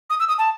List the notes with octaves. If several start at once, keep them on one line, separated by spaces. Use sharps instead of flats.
D#6
E6
D#6
A5